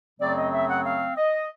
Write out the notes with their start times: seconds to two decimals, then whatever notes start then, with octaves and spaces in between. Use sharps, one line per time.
0.20 F#2 C#3 F#3 A3 C4 D5
0.37 D#5
0.53 E5
0.69 F#5
0.85 F5
1.17 D#5